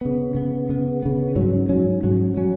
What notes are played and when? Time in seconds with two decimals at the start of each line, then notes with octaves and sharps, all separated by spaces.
0.01 C#3 B3
0.35 C#3 B3
0.69 C#3 B3
1.03 C#3 B3
1.36 G#2 F#3 C#4
1.69 G#2 F#3 C#4
2.03 G#2 F#3 C#4
2.37 F#3 C#4